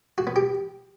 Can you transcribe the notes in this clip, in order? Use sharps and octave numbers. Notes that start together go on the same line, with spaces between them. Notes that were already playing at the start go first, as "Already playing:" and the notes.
F#4
B3
G4